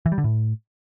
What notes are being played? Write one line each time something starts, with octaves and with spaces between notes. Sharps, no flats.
E3
G3
D3
A2